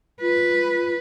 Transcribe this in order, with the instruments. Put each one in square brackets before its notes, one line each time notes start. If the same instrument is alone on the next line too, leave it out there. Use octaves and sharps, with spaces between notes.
[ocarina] F4 [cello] B4